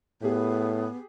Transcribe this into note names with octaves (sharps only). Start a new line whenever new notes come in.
A2 B3 G4 G#4